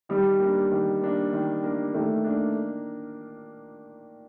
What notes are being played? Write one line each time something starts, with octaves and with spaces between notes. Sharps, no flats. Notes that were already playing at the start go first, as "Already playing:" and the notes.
D#3 G3
A#3 D4
D#3
A#3 D4
D#3
A#3 D4
D#3 A3
A#3 D4